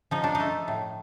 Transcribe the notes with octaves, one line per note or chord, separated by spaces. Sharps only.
F3 D#4
D4
D#4
A3
A2